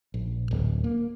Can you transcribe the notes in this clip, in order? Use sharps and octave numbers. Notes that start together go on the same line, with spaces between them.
A#1
D1
A#3